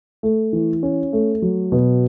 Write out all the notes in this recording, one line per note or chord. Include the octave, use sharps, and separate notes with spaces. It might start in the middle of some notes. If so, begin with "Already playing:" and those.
A3
E3
C#4
A3
F#3
B2